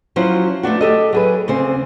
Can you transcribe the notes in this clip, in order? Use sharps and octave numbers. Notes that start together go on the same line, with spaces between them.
F3 F#3 C#4 E4 C5
A3 B3 D4 F#4
G4 A4 D#5
F#3 G#4 B4
D2 C#3 C4 C5